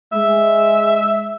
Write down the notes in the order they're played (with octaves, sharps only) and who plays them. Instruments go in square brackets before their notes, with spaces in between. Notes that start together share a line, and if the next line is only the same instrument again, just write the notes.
[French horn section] G#3 [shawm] E5